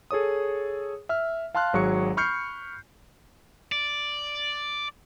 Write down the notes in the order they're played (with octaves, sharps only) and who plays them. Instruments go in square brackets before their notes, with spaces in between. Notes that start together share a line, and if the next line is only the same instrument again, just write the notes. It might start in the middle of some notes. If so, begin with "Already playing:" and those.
[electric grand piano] G#4 A4 C#5 D#6
E5 F6
F5 A5 C6 F6 F#6
G#1 F#3 G#4 C#6 C#7
B5 C#6 F6 G6 C7 C#7
[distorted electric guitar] D5